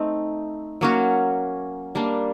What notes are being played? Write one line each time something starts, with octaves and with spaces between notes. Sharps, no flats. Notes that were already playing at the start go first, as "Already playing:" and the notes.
Already playing: A3 C4 D#4
F#3 A#3 C#4 F#4
G3 A#3 D4